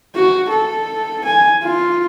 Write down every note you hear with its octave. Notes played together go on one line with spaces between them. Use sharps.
F#4
A4
G#5
F4